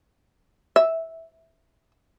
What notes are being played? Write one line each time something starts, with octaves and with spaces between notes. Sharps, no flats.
E5